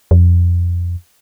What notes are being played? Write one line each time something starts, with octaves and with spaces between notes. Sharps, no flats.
F2